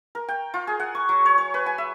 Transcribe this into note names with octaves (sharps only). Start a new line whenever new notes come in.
A#4
G5
F4
G#4
F#5
C#6
F#3
C#5
C#5
B4
G#5
E5